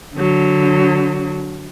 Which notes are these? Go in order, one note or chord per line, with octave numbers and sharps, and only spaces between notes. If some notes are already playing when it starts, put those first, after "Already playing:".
D3 F#3